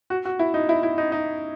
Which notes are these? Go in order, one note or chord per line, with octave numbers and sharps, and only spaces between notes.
F#4
F#4
E4
D#4
E4
E4
D#4
D#4